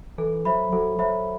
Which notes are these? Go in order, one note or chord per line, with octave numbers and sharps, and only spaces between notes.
E3 A4
F#3 C5 E5 B5
F#3 A4
F#3 C5 E5 B5